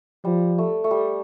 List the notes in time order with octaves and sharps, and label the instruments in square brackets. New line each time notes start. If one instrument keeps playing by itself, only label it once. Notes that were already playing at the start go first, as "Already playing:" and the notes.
[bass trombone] F3 [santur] G3
[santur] A3
A3
G3